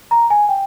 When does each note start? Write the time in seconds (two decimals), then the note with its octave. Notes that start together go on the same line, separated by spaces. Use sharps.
0.11 A#5
0.30 G#5
0.49 G5